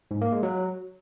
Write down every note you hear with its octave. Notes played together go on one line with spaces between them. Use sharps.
G#2
A#3
G#3
F#3